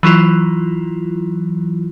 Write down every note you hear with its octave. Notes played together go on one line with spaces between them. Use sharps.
E3 F#3 E4 F4